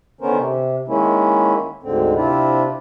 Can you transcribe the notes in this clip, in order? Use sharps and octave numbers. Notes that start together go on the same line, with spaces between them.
D3 D#3 B3 C#4 A#4 C5
C3
D#3 G#3 A#3 C#4 E4
D2 G#2 D3 C4
C3 C4 D4 E4 F4